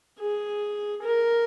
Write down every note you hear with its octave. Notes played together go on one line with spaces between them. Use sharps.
G#4
A#4